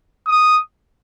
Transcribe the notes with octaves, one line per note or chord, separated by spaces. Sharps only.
D#6